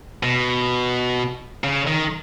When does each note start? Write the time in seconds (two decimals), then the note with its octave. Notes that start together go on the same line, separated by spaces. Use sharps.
0.23 B2
1.64 C#3
1.87 D#3